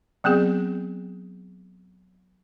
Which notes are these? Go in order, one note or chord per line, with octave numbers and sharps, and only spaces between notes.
F#3 B3 C4 G#4